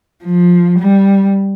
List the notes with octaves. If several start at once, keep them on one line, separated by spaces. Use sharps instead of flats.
F3
G3